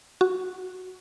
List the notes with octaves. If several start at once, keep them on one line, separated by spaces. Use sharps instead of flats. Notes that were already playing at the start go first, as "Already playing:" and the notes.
F#4